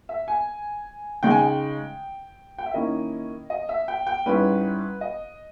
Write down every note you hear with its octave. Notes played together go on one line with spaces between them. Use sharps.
E5
G#5
C#3 G#3 D#4 G5
G#5
G5
G5
E5
D#3 A#3 C#4 E4 D#5
D#5
E5
G5
G5
G#2 G3 C#4 E4 B4
D#5